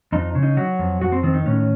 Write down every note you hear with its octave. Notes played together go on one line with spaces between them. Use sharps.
F2 D#4
C#3
D#4
F#3 F#4
F2
F2 F#4
C4
D#3 C4
D#4
A2 C#4